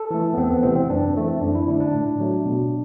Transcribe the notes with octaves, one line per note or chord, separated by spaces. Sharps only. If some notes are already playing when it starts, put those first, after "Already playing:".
Already playing: A4
E3 A3
B3
E2 C4
B3
C3 E3 A3 C4
C4
F#2 D4
E3 A3 C4
F#2 D4
E4
D3 A3 D4
D4
A2
F#3 A3
B2